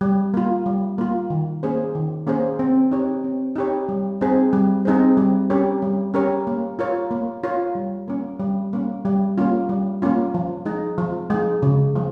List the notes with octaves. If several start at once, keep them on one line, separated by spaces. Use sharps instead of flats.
G3
A#3 F4
G3
A#3 F4
D#3
A#3 C#4 G#4 C5
D#3
A#3 C#4 G#4 C5
C4
D#4 G4 C#5
C4
D#4 G4 C#5
G3
C4 D#4 G#4 C5
G3
C4 D#4 G#4 C5
G3
C#4 G4 A#4 C#5
G3
C#4 G4 A#4 C#5
A#3
F4 A#4 C#5
A#3
F4 A#4 C#5
G3
A#3 C#4
G3
A#3 C#4
G3
A#3 C#4 F4
G3
A#3 C#4 F4
F3
G#3 D#4
F3
G#3 D#4
C#3
F3 G#3